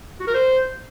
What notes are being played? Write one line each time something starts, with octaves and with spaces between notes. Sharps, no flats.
F#4
A#4
C5